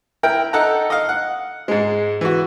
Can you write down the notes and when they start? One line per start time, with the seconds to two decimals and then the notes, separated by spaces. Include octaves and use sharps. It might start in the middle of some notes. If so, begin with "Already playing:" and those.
0.23 E4 A#4 G5
0.53 D#4 A4 F#5 A#5
0.90 D#5 F5
1.09 F#5
1.68 G#2 G#3
2.21 E3 F#4